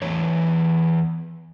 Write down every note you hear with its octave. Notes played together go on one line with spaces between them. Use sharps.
E2 E3 C#5